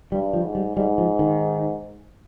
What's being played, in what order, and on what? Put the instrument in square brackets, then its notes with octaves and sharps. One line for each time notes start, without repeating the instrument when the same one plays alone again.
[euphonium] G2 [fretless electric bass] G3
[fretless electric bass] F3
[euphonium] G#2
[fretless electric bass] G3
[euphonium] G#2 [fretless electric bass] G3
[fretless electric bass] F3
D#3